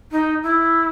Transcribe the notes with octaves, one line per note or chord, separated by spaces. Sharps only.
D#4
E4